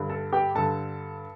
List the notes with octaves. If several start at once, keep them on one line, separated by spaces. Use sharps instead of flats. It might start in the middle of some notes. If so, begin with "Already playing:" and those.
Already playing: G2 D3
A4 A5
G4 G5
G2 D3 A4 A5